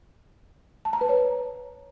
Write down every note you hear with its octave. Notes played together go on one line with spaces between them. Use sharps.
A5
A#5
B4
C#5